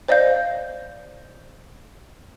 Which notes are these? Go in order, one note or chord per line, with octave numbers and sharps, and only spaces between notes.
C5 D5 D#5 F5 G6